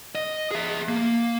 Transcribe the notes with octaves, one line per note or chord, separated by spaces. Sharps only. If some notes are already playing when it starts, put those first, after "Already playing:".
D#5
G#4 E5
A#3